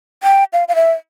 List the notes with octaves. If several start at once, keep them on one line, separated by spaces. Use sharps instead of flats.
G5
F5
F5
E5